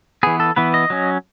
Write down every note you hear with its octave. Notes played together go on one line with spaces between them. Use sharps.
E3 B3 G#4
A4
E3 B3 B4
D#5
F#3 C#4